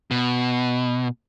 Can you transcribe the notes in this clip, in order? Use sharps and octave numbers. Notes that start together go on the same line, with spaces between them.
B2